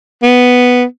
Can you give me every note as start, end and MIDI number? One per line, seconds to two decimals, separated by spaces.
0.23 0.84 59